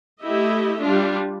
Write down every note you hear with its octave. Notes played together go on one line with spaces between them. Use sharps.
A3 E4 G4 D#5 E5
G3 D4 F4